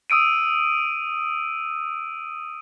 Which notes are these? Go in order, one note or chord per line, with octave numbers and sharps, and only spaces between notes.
D#6 E6 D7 D#7